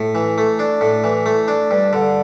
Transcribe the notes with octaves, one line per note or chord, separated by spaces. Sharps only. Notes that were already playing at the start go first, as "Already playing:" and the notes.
Already playing: A2
E3
A3
D4
A2
E3
A3
D4
G2
D3